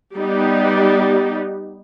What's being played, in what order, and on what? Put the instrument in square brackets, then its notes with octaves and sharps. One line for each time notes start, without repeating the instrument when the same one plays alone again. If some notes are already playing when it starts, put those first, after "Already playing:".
[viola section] G3 B3 D#4 G4